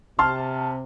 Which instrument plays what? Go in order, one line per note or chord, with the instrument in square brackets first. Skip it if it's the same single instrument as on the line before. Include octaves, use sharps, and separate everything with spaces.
[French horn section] C3 [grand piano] A5 C6 F6